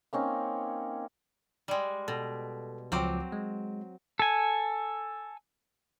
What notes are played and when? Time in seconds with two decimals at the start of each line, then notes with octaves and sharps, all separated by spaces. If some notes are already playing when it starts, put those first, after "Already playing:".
0.13 A#3 C4 C#4 D#4
1.68 G3 G#3
2.08 B2 A4
2.92 C#2 F3 F#3 C4 D6
3.32 G#3
4.19 A4 G#5